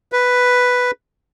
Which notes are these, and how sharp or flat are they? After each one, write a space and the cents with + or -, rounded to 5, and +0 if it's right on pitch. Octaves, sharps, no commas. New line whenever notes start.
B4 +0